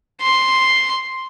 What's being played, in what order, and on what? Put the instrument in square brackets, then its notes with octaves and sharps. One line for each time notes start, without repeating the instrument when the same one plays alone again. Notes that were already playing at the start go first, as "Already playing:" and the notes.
[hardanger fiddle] C6